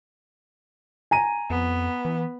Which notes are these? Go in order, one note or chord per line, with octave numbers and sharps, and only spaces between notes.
G#5 A#5 D#7
F2 B3
E3